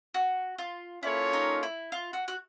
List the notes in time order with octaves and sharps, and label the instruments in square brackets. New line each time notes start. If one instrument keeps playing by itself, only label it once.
[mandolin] F#4
F4
[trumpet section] A#3 C#4 F4 A4 C#5 [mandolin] E4
[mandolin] D#4
E4
F4
F#4
F#4